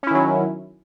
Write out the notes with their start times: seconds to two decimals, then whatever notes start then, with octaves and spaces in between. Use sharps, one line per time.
0.03 C#4
0.07 E4
0.11 D#3
0.15 F#3